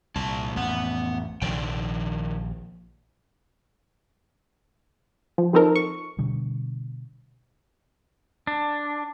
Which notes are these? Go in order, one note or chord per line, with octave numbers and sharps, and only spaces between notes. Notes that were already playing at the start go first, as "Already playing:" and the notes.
C2 A#2 A5
A1 F2 B3 F#5
A#1 C3 D#3 F3 D4 G5
F3
F3 C4 D#4 A4 A#4
C#6
B2 D3 G3
D4